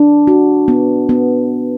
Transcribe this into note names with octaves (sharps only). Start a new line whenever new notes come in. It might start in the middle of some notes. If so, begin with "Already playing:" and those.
Already playing: D4
F#4
B3
B3